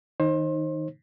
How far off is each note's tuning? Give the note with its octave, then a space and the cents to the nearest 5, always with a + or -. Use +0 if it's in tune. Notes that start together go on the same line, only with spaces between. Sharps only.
D#3 +15 D#4 +0 C5 +30